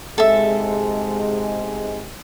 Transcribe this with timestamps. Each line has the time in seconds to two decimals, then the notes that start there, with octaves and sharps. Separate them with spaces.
0.18 G#2 C3 G#3 A4 E5